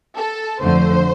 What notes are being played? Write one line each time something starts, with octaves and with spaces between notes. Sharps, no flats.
A4
F2 D3 F3 A3 C5